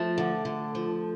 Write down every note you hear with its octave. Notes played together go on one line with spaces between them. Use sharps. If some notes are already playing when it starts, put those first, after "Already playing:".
Already playing: F3 A3
D3
D3
F3